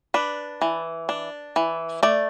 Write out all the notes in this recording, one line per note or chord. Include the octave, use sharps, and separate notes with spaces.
D4 B4
E3
D4
E3
A3 D5